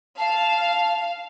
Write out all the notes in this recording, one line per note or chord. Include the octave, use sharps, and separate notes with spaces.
F5 A5